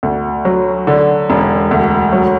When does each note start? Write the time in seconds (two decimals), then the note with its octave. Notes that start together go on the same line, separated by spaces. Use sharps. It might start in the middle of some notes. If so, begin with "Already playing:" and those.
0.03 D2
0.45 F#3
0.87 D3
1.30 E1
1.71 D2
2.12 F#3